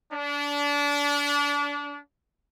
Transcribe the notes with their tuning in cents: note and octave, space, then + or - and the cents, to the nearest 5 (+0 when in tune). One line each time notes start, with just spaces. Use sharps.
D4 -30